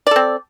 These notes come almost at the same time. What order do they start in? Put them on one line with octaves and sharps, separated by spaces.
D5 A4 C4